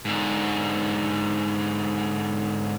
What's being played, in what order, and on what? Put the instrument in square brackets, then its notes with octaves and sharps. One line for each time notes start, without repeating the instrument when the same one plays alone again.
[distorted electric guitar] G#2 D3